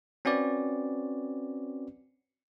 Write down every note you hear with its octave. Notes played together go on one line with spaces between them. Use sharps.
C4 C#4 F#4 B4 D5